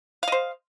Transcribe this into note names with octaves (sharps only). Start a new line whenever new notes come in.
C5 D#5 F5